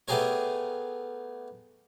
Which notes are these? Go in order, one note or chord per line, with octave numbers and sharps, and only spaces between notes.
A3 B3 G4 G#4 A#4 C#5